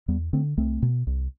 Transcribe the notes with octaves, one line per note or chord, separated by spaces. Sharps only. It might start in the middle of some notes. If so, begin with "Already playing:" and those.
E2 G3 B3
D3 A3 C4
C2 A3 C4
B2
C2